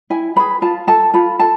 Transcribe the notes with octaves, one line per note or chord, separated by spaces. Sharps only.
E4 G#5
G#4 B4 B5
F4 A5
A4 A5
F4 B5
A4 A5